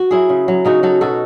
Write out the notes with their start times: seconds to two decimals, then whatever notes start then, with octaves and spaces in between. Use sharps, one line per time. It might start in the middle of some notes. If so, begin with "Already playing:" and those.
Already playing: F#4
0.11 F#3 E4 G#4
0.29 C#3
0.48 F#3
0.65 C#3 D#4 F#4
0.83 F#3 F#4 A4
1.01 B2 F#4 A4